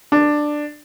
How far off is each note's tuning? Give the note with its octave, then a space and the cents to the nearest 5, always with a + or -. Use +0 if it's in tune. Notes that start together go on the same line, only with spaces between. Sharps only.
D4 +10